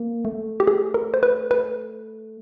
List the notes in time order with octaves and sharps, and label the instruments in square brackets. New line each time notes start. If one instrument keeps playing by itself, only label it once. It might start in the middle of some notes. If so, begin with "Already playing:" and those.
Already playing: [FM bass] A#3
A3
[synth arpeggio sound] G4
G#4
A#4
C5
B4
B4